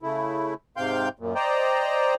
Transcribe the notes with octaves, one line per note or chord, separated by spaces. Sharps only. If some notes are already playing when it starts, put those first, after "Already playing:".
C#3 A3 E4
G#2 C3 F5 G5 C6 G6
F#2 A#2
C5 D5 D#5 G5 A#5